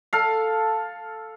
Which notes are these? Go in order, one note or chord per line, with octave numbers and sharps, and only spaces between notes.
A4 F5